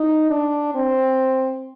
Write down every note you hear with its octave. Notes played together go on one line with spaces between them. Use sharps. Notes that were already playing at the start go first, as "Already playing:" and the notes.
Already playing: D#4
D4
C4